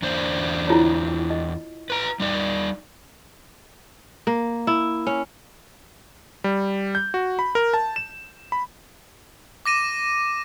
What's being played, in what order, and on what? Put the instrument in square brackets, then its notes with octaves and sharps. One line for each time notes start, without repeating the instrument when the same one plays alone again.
[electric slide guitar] E2 D4 C5
[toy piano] E4 F4 C#5
D#5
[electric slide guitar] B4 A#5
G3 D#4 D5
[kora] A#3
E4
C#4
[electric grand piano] G3
G6
F#4
B5
A#4
A5
E7
B5
[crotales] D6 A#6 D#7 E7